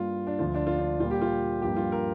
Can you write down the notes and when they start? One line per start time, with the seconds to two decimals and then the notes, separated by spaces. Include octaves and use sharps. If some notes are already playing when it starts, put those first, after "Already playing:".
Already playing: G2 G3 A#3 F4
0.27 D4
0.39 D2 D3 F3 F4
0.55 D4
0.67 F4
0.79 D4
1.00 A#2 G3 A#3 F4
1.11 G4
1.21 F4
1.62 G2 F3 A#3 G4
1.77 F4
1.92 A#4